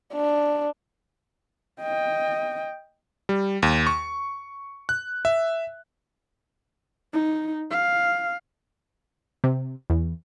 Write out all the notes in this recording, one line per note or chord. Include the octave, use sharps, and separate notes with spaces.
D4
D#5 G5
G3
D#2
C#6
F#6
E5
D#4
F5
C3
E2